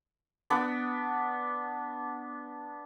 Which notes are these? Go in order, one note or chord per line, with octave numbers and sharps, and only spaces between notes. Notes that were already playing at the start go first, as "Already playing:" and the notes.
B3 D4